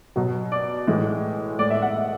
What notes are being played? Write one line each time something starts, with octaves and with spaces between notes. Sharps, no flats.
B2 F#3
D5
A2 E3 G#3
A2 G#3 D5
E5
F#5
E5